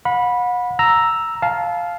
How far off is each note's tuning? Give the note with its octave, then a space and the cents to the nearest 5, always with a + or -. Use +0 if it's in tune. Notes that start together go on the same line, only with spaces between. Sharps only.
F#5 -40 B5 -10
A#5 +0 E6 +0
F5 +0 A5 -25